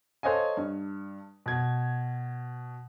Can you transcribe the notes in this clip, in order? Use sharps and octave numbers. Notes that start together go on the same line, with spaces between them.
A4 C5 C#5 D#5 F5 G#5
G2
B2 G#6